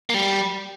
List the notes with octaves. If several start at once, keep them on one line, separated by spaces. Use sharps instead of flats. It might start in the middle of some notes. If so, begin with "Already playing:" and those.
A#3
G3